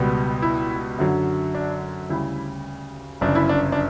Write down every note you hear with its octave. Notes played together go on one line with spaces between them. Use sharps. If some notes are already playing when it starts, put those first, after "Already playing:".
Already playing: C#2 B2 G3 B3
E4
F#2 D3 F#3
D4
D2 C#3 G3 E4
G1 F#2 C#3 D4
E4
D4
D4